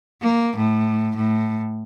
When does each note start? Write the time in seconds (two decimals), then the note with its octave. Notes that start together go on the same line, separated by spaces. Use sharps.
0.22 A#3
0.56 A2
1.16 A2